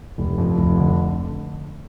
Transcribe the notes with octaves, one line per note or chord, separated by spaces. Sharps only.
F1
F2
F1
D3